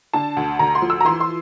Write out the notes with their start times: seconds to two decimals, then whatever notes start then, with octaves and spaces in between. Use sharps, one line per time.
0.14 D3 A5
0.37 D2
0.59 D2 A#5
0.75 C6
0.82 F3
0.90 E6
1.01 A#5
1.05 E3 C6
1.20 C6